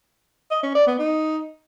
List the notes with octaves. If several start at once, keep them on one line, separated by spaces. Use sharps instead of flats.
D#5
C#4
D5
B3
D#4